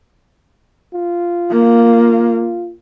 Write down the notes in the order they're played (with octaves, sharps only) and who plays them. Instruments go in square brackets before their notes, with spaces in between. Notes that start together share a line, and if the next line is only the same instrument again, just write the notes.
[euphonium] F4
[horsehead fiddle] A#3